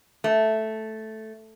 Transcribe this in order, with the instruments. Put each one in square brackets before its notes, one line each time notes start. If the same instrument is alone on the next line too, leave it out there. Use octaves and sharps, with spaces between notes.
[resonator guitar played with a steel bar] A3